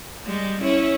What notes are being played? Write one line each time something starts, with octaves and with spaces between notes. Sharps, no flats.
G3 G#3
C#4 E4 C#5